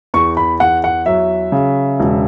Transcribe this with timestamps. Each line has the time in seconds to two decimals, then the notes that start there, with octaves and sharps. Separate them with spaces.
0.14 E2 C#6
0.37 B5
0.60 E2 F#5
0.84 F#5
1.06 F#3 E5
1.52 C#3
2.00 E1